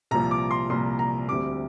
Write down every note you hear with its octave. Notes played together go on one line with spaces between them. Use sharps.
C2 A#2 F3 A#5
D6
C6
C2 A#2 F3 C6
A#5
D2 C3 G3 D6